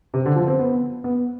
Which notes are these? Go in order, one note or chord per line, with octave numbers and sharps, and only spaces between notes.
C3
D3
F3
C4
B3
B3